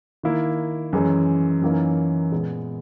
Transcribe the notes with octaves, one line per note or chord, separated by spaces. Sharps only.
D#3 A#3 E4
F#2 E3 G#3 C#4
F#2 E3 A#3 D#4
A#2 G#3 B3